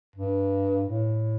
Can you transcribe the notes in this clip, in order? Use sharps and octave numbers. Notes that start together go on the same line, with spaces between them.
G2
A2